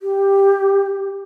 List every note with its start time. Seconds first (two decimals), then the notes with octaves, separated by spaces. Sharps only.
0.01 G4